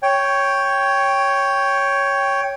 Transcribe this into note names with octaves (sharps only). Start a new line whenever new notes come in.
C#5 G5